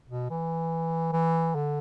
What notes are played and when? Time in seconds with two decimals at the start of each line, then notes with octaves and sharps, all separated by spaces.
0.09 B2
0.30 E3
1.13 E3
1.55 D3